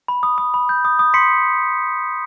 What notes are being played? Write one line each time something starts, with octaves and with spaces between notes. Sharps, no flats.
B5
D#6
D#6
B5
G6
D#6
D#6
C6 B6 C#7